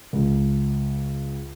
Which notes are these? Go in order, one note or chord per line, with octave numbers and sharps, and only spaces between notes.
C#2